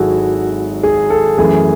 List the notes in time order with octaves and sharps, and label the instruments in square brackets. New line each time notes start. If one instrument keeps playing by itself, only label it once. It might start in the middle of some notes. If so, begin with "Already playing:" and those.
Already playing: [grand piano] G#1 G#2 F#3 E4 F#4 G#4 A4
G#4
A4
F#2 E3 A3 G#4